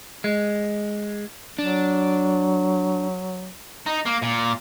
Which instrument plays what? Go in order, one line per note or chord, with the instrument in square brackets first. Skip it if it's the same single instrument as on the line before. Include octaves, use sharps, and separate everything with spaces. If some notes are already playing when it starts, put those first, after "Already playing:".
[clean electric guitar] G#3
[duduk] F#3 [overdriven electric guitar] D4
[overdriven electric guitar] D#4
A#3
A#2